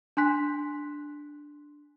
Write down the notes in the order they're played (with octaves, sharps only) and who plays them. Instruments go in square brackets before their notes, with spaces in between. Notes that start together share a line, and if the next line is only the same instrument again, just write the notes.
[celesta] D4 G#5 C6 F#6 B6